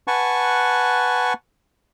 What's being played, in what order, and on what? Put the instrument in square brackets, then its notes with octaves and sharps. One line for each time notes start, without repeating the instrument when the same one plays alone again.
[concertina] B4 F#5 G#5 A5 C#6